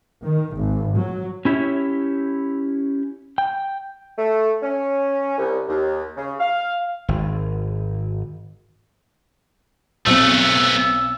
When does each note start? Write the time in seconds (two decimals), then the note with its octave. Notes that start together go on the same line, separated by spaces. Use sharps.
0.25 D#3
0.56 G#1
0.97 F#3
1.45 C#4 E4 G4 C#5 E5
3.38 G5
4.17 A3
4.62 C#4
5.38 C2
5.68 D#2
6.16 C#3
6.39 F5
7.08 G#1
10.06 B1 A3 B3 C4 E6 F#7